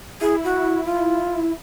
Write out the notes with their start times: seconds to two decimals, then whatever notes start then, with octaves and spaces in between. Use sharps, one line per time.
0.21 E4 G#4
0.44 F#4
0.85 F4